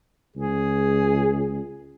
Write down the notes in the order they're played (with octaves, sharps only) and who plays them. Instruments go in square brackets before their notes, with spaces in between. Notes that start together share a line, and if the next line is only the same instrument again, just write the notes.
[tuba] C#2 [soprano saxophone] G#4